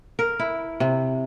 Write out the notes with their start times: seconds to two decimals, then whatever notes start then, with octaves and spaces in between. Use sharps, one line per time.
0.19 A#4
0.39 E4
0.80 C3